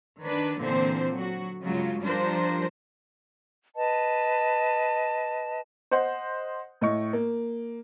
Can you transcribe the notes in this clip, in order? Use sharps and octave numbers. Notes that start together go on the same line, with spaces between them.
D#3 D4 B4
A#2 D3 E3 C4 C5
F#3 F#4
G2 C#3 F#3 G#3 F4
F3 G3 D4 F4 A#4 C5
B4 D#5 A5
C5 D#5 F#5 C6
A2 D#5 C#6
A#3